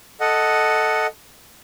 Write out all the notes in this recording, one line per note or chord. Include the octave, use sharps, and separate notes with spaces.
A4 D#5 F#5